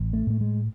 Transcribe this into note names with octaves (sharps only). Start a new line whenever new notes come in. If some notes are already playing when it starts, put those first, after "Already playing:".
Already playing: A1
A3
A2 A3
G#3